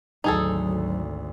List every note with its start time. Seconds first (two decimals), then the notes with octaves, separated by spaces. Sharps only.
0.24 G#1 D2 F#3 D#4 G#4 A4